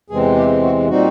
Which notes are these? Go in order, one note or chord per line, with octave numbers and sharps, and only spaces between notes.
E2 C3 E3 G#3 C4 G#4
G4
F#4
A#2 G3 C4 D#4 F#4